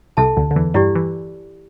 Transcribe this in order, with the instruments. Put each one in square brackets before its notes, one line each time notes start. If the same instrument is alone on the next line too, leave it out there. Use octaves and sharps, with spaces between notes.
[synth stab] C2 C3 [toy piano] A4 E5 A5
[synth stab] D2 D3
D3
E2 E3
[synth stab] G2 G3 [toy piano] E4 G4 D5
[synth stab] E3